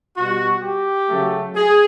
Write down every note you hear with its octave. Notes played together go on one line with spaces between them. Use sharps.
B2 G3 F#4
G4
C#3 F#3 A3
G#4